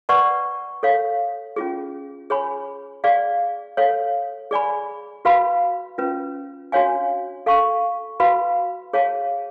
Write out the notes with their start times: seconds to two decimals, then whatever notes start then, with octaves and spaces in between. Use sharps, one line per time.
0.09 B4 D5 F#5 A5 C#6
0.83 A4 C#5 F5
1.56 C#4 F4 G#4
2.30 G#4 C#5 G#5 B5
3.04 G#4 D5 F5
3.77 A4 C#5 F5
4.51 G#4 D5 G#5 B5
5.25 F#4 B4 F5 B5
5.98 C#4 F4 B4
6.72 D4 F#4 C#5 F5 G#5
7.46 A4 F5 A5 C#6
8.20 F#4 B4 F5 B5
8.93 G#4 C#5 F5 A5